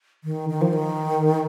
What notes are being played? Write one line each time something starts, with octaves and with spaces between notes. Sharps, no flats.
D#3
D#3
F3
D#3